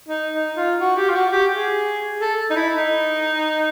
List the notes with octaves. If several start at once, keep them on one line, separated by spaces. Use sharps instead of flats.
D#4
D#4
F4
F#4
G4
F4
F#4
G4
G#4
A4
D#4
E4
D#4